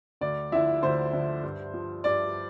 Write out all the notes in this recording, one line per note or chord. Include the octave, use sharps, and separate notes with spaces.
D2 D5
D3 F3 E4 E5
D2 C5
D3 F3
G2
F3
G2 D5